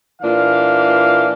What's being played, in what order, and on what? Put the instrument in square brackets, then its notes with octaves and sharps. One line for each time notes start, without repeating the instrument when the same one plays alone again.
[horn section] A#2 E3 D4 F5